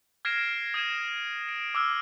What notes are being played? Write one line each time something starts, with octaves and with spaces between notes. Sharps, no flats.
F6 G#6 A#6 C7 D7 E7
D#6 G#6 D#7 E7
D7
D6 E6 F6